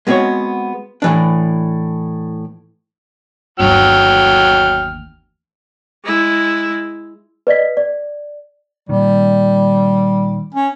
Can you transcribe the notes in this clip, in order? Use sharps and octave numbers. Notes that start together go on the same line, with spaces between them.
G#3 B3 C4 F#4 C#5
A2 E3 D4
G1 D#2 F#3 G5 F6
G#3 E4
B4 D5 D#5 B6
D5
A#2 D#3 G3
C#4